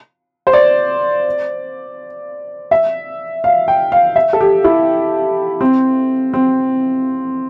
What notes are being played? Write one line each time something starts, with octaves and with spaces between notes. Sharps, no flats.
C5
D5
E5
F5
G5
F5
E5
A4
G4
E4
C4
C4